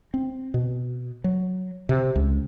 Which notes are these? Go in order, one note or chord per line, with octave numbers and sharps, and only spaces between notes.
C4
B2
F#3
C3
C#2